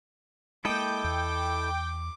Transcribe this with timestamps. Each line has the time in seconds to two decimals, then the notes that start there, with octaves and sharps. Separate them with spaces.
0.65 G#3 A#3 E4 A4 D#5 G5 D6
1.04 E2